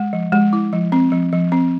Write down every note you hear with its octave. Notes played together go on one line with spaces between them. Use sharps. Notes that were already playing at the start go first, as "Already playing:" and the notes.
Already playing: G#3
F3
G#3
E4
F3
C4
F3
F3
C4